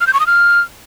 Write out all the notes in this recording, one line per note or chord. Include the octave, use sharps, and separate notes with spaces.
F6
G6
C#6
D#6
F6